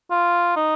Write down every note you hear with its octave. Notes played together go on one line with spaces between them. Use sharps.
F4
D#4